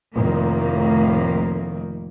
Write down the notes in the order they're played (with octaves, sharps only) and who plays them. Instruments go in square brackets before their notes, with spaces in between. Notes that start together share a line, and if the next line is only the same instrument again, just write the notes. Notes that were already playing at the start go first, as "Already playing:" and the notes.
[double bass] F1 D#3 [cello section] F2 A2 A#3